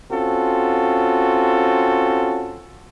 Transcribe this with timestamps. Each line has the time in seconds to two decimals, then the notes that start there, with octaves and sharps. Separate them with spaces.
0.11 C4 C#4 F4 F#4 A4